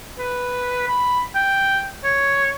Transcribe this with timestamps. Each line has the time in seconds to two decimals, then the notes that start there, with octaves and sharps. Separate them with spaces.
0.19 B4
0.88 B5
1.35 G5
2.04 C#5